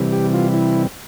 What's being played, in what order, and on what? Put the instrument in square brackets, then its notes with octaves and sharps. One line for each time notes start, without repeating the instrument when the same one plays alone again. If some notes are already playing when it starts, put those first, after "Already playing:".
Already playing: [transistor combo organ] C3 E3 G3
G4
F4
E4